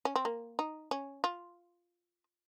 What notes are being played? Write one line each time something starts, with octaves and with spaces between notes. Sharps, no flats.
C#4
C4
A#3
D#4
C#4
F4